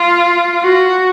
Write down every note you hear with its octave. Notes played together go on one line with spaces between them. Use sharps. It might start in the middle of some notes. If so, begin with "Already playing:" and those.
Already playing: F4
F#4